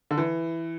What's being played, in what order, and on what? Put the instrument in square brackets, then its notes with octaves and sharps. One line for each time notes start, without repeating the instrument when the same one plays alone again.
[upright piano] D3
E3